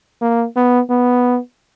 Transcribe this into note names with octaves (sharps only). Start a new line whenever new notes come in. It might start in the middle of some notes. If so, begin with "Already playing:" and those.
A#3
B3
B3